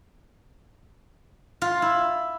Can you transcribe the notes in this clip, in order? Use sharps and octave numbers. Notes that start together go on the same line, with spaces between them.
F4
E4